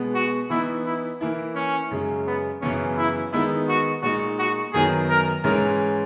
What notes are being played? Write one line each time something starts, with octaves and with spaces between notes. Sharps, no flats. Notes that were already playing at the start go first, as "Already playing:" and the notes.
Already playing: B2 G#3 B3
F#4
E3 B3 D#4 E4
E4
E3 A#3 E4
C#4
F#2 C#3 G#3
B3
F#2 C#3 E3 B3 C#4
E4
D#3 G#3 B3 D#4 E4
F#4
A#2 G#3 D#4 F#4
F#4
F#2 D#3 F#3 B3 G#4
A#4
G#2 E3 G#3 C#4 A#4